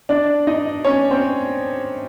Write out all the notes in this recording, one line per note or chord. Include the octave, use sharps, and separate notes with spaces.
D4 D5
D#4 D#5
C#4 C#5
C4 C5